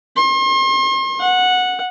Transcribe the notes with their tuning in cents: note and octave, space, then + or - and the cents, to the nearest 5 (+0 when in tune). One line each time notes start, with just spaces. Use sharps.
C6 +40
F#5 -10